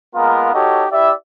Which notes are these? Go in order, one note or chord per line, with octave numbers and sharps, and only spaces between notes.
G#3 A#3 B3 F4 A#4
D#4 F#4 G4 A4 C#5 D#5
E4 G4 D5 E5